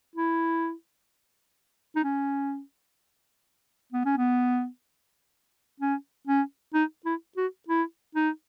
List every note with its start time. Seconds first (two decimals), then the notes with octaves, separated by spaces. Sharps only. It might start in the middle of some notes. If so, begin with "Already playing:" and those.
0.16 E4
1.96 D#4
2.04 C#4
3.92 B3
4.05 C#4
4.17 B3
5.80 C#4
6.27 C#4
6.74 D#4
7.05 E4
7.37 F#4
7.68 E4
8.15 D#4